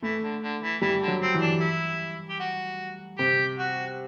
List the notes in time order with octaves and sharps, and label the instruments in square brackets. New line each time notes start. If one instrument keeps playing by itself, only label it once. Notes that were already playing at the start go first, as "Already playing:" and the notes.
[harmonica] E3 [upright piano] A3
[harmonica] D3
D3
E3
[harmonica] E3 [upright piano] G3
[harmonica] D3
[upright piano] F#3
[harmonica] C4
[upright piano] E3
[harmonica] D4
E4
G4
F#4
[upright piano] C3 [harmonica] G4
[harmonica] F#4